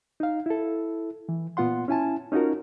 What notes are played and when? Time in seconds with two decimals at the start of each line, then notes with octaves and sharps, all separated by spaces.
0.20 D#4 F5
0.46 E4 A4
1.29 E3
1.57 A#2 B3 F4 F#5 C6
1.88 C#4 E4 G#5 A5
2.32 C#4 D#4 F4 F#4 A#4